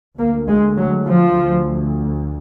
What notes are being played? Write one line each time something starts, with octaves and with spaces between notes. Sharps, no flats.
D2 A#3
G#3
F#3
F3
D2